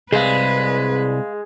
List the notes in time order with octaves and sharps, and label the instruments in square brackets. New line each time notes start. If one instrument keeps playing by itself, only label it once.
[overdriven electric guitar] C2 [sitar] G#3 [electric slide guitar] G#4 F5 [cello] B4